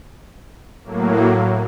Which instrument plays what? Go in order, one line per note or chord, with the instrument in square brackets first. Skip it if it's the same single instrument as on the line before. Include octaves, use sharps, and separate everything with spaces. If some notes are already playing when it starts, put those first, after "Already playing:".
[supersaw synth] A2 F#3 A#3